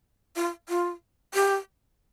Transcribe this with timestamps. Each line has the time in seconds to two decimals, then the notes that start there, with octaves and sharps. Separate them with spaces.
0.36 F4
0.69 F4
1.34 G4